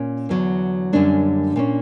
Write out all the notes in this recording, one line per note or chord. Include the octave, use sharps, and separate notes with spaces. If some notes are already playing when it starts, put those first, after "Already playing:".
Already playing: A#2 A#3 C#4
E2 D3 F#3
F#2 D3 G3 A#3 C#4 D4
A#2 A#3 C#4